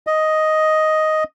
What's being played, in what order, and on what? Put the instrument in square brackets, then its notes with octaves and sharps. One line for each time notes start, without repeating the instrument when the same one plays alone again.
[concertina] D#5